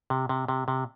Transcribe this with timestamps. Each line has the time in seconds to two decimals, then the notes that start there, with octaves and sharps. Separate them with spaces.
0.10 C3
0.29 C3
0.48 C3
0.68 C3